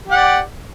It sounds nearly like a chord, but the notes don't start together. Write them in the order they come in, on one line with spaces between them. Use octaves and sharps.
G4 F#5 D5